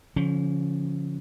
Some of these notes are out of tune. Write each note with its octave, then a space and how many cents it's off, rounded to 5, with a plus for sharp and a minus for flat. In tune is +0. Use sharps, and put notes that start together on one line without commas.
D3 -40 F3 +0 C#4 +0